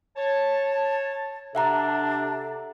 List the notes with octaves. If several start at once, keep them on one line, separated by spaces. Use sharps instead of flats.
C#5 A5
C3 D4 A4 E5 F#5 A#5